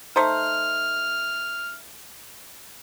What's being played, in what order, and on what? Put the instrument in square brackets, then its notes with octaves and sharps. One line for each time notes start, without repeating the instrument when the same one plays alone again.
[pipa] A3 D#4 C5 [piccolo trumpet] F6